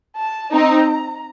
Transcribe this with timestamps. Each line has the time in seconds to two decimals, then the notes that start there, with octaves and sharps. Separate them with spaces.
0.17 A5
0.52 C4 D#4 A#5